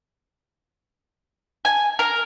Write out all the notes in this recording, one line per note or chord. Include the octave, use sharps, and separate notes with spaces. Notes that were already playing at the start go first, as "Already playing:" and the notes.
G#5
A#4